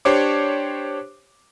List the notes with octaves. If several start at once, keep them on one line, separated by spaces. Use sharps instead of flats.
D4 G4 C5 C#5 D6